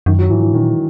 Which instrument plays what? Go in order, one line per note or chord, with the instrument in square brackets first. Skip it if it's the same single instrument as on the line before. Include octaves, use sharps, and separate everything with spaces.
[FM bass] F#2 [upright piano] D#3
[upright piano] F#3
[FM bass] G#2 [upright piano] E3
[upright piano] E3
[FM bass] A#2 [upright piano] D#3